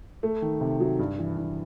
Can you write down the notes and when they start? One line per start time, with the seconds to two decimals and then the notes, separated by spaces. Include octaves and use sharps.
0.23 A3
0.42 D#3
0.61 C3
0.80 F#3
0.99 G2
1.18 E3
1.37 G2